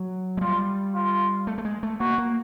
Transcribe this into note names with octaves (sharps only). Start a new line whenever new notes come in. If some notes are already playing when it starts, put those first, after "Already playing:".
Already playing: F#3
G#3
G3 F4
F4
A3
A3
G#3
A3
A#3 F#4
A#3